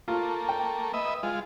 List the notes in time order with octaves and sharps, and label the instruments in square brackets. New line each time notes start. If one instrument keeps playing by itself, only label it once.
[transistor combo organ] A3 A#3 [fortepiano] F4
[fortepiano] G5
[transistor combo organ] B4 D#5 E5
G#3 F4